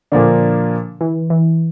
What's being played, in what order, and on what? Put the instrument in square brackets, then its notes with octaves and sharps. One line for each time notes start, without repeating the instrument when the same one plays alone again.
[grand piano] A#2 F3 A#3 D4 [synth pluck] D3
[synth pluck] E3
E3